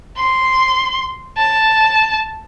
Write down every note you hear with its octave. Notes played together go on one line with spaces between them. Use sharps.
C6
A5